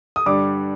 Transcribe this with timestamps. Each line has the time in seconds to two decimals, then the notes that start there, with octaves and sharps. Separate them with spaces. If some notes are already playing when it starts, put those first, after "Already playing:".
0.16 D#6
0.26 G2 D3 G3 D4 D6